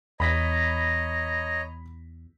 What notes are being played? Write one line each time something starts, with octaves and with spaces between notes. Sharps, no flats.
E2 C#5 D#5 A#5 B5 A#6 B6